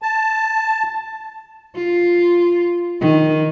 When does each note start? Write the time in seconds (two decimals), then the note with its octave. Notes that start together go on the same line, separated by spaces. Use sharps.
0.02 A5
1.75 F4
3.01 D#3